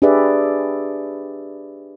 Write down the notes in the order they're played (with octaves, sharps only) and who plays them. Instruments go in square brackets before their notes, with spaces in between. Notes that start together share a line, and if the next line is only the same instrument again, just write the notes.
[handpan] D4 G4 G#4 B4 D5 E5